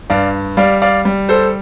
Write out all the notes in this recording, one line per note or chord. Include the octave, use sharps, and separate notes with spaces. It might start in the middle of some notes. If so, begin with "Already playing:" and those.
G2 D5 F5
G3 D5 F5
D5 F5
G3
A4 C5